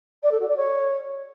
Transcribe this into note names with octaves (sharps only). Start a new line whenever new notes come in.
D5
A4
F#4
D5
C#5